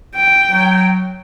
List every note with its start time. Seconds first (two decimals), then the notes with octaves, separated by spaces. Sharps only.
0.15 G5
0.49 F#3